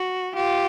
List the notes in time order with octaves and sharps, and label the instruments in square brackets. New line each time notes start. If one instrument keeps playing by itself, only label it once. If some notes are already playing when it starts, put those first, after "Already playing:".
Already playing: [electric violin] F#4
[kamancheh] F4 [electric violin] G4